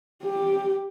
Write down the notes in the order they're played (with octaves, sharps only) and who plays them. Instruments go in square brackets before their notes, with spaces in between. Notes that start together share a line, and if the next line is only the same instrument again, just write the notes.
[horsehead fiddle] G4